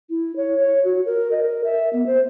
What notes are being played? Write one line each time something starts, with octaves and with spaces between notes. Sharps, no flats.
E4
C#5
C#5
F#4
A#4
D#5
A#4
E5
B3
C5